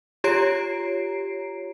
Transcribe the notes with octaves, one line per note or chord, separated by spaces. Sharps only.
F4 G4 C#5 A#5 C7 D7